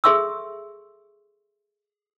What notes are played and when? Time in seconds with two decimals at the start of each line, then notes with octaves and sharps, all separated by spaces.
0.04 G#4 A4 E5 C6 C#6 E6